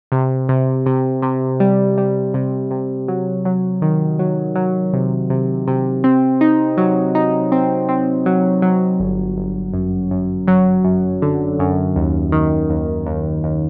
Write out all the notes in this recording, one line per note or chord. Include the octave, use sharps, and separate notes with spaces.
C3
C3
C3
C3
G3
G3
C3
C3
F#3
F#3
D#3
F#3
F#3
C3
C3
C3
C4
D#4
F#3
D#4
C4
C4
F#3
F#3
G1
G1
F#2
F#2
F#3
F#2
D3
F#2
D#2
D#3
D#2
D#2
D#2